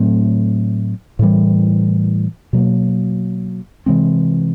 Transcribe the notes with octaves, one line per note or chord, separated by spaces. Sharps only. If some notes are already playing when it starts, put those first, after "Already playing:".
Already playing: A2 F#3 A3 C4
A2 E3 G3
B2 F#3 A#3
C3 E3 G#3 C4